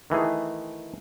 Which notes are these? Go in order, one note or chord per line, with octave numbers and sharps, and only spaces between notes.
D#3 E3 A3 G#4